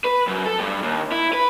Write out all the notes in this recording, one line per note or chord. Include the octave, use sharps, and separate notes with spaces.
B4
F#2
A4
G2
D#2
E4
B4